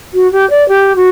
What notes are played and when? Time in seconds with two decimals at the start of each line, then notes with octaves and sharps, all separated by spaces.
0.13 F#4
0.32 G4
0.50 D5
0.68 G4
0.96 F#4